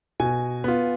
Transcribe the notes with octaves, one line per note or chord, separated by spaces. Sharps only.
B2 G#5
B3 F4